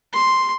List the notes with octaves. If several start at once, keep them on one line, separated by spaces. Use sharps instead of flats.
C6